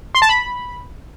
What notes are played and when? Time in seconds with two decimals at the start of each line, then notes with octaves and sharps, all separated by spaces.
0.15 C6
0.22 A5
0.29 B5